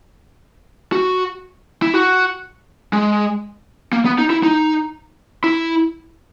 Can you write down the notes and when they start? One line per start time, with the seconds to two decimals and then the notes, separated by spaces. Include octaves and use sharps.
0.92 F#4
1.82 E4
1.94 F#4
2.93 G#3
3.93 A#3
4.05 B3
4.18 D#4
4.30 E4
4.43 D#4
5.44 E4